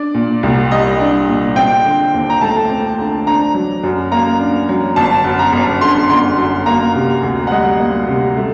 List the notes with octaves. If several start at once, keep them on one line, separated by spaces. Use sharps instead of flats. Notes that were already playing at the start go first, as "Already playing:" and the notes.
Already playing: D4 D5
A#2
C2
G3 D#5
D4
A#2
C4 G5
D3
D#2
A#5
A3 A5
C4
D3
D4 A#5
F#3
F#2
A#3 A#5
D4
F#3
G1 A5
F#2
A#5
G1
D3 C6
G1 C6
F#2
A#3 A#5
C3
D2
F#5
G3 D#5
A#3
C3
A3